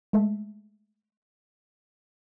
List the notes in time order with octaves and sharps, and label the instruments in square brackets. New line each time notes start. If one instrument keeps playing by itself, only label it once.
[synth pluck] G#3 A3 A4 E5